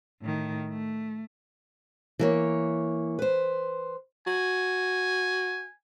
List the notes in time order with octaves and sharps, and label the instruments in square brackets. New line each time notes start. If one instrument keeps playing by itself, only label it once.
[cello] A2 D#3
A3
[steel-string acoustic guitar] E3 A#3 C#5
B4 C5
[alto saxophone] F#4 [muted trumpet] G#5